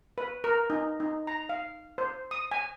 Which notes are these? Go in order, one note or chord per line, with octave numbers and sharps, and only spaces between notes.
B4
A#4
D#4
D#4
A#5
F5
C5
D#6
G#5